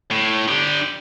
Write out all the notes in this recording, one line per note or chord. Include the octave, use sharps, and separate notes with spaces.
A2
D3 G4